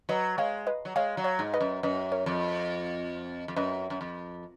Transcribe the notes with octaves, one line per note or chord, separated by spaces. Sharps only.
F#3 B4 D#5
G#3 C#5 F5
B4 D#5
F#3
G#3 C#5 F5
F#3
C#5 F5
G#2
B4 D#5
F#2
F#2 B4 D#5
A#4 C#5
F2
F2
F#2 B4 D#5
F#2
F2